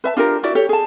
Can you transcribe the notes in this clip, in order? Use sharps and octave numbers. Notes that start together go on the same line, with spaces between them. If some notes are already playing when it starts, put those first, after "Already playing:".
B4 E5 A5
D4 F4 G4 A#4
E4 F#4 D5 E5
G4 A4 C#5
G#4 A5